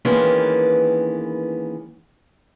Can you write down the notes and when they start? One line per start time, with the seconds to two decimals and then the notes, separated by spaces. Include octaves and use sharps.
0.05 D#3 E3 G#3 A#3 B3 C#4